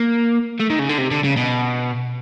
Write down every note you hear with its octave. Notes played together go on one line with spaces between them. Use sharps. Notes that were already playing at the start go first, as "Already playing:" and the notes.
Already playing: A#3
A3
D#3
C#3
D3
C3
D3
C#3
B2